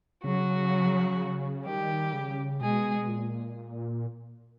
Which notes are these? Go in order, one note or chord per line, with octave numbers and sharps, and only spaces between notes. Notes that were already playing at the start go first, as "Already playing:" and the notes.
C#3 F#3 F#4
D#3 G3 G4
C#3
B2 G#3 G#4
A#2